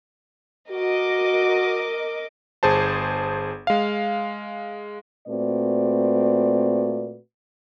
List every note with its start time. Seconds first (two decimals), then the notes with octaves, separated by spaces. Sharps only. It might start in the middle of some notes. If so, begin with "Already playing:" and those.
0.70 F#4 A#4 D#5 D6
2.63 G1 G#4 C5 A5
3.67 G#3 F5
5.27 A#2 A3 C4 F#4 B4 D5